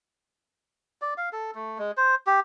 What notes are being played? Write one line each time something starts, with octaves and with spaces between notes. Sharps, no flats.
D5
F5
A4
A3
G#3
C5
G4